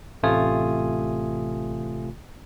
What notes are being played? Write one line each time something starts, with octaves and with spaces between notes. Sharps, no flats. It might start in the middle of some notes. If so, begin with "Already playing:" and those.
A1 C3 A3 F4 G#5 D#6